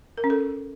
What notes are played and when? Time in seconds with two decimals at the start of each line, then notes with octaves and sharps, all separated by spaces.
0.18 A#4
0.24 C#4
0.30 A4